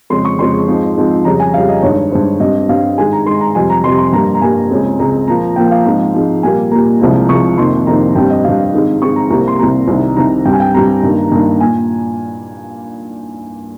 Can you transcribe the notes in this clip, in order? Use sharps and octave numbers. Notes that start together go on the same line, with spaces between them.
F2 C#3 G#3 C4 C6
C#6
F2 C#3 G#3 C4 C6
G#2 F3 G#3 C4
G#2 F3 G#3 C4
F2 C#3 G3 A#5
G#5
F2 C#3 G3 F5
D#5
G2 D#3 G#3 C#5
G2 D#3 G#3 C5
G2 G3 C4 D#5
G2 G3 C4 F5
G#2 D#3 G#3 G#5
A#5
G#2 D#3 G#3 C6
A#5
F2 C3 G3 G#5
A#5
F2 C3 G3 C6
C6
G2 G3 A#3 A#5
A#5
G2 G3 A#3 G#5
C#2 C#3 G#3 C4
C#2 C#3 G#3 C4 A#5
A#2 F3 A#3 A#5
A#2 F3 A#3 G5
F5
G#2 F3 G#3 C4
G#2 F3 G#3 C4
A#2 G3 A#3 G#5
A#2 G3 A#3 A#5
C2 C3 F3 G#3
C2 C3 F3 G#3 C#6
F2 C3 D#3 A#3 C6
F2 C3 D#3 A#3 A#5
G2 G3 C4 G5
D#5
G2 G3 C4 F5
G#2 D#3 G#3 C4
G#2 D#3 G#3 C4 C#6
A#5
C2 C3 G3 A#3 A#5
C6
C2 C3 G3 A#3 A#5
C2 C3 D#3
C2 C3 D#3 A#5
G2 G3 C4 G5
G#5
G5
G2 G3 C4 A#5
G2 D#3 A#3
G2 D#3 A#3
A#2 G#5